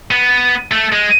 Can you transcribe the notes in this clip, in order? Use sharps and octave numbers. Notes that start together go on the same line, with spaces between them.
B3
A3
G#3